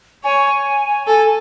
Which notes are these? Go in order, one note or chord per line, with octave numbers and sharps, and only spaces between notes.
C#5 G#5
A4 G#5